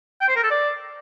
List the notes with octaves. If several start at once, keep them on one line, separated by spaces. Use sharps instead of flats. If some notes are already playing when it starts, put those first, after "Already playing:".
G5
C5
A#4
A4
D5